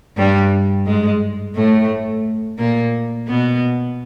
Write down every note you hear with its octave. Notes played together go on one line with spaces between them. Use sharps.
G2 G3
G#2 G#3
A2 A3
A#2 A#3
B2 B3